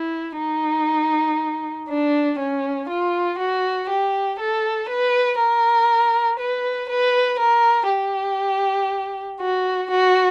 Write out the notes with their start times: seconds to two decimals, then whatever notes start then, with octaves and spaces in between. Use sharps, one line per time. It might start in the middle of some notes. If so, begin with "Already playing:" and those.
Already playing: E4
0.38 D#4
1.89 D4
2.39 C#4
2.89 F4
3.39 F#4
3.89 G4
4.39 A4
4.89 B4
5.39 A#4
6.39 B4
6.89 B4
7.39 A#4
7.89 G4
9.40 F#4
9.91 F#4